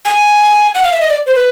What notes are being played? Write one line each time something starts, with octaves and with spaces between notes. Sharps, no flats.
G#5
F#5
F5
E5
D#5
D5
C5
B4